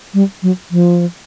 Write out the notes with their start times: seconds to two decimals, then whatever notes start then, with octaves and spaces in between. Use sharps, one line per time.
0.14 G3
0.43 F#3
0.71 F3